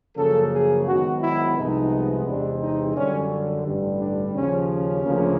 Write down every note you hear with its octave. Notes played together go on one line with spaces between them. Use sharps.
F#2 C#3 F3 A#3 A4
G#4
G#2 D#3 F#3 B3 F#4
E4
C2 C3 F3 G#3 B3 D#4
E2 C3 E3 G#3 C4 D4
D#4
F#2 D3 G3 C#4
A1 G2 D3 G3
D4
D#2 C#3 F3 C#4
C#4
D2 C#3 F3 A#3